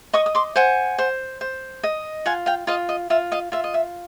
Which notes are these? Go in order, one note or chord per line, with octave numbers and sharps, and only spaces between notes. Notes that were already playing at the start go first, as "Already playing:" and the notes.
D#5 C#6 D#6
D#6
C6 D6
C5 F#5 G#5
C5
C5
D#5
F4 F#5 G#5
F5 G5
F4 D#5 F5
D#5
F4 E5
D#5 F5
F4 E5
D#5
E5